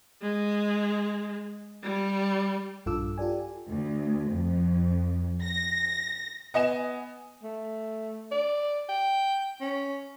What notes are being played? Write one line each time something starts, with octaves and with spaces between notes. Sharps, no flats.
G#3
G3
A#1 G2 F4 A4 D6 E6
F4 G4 A4 D5 G#5
D2
F2
A#6
B3 D#5 G#5 E7
A3
D5
G5
C#4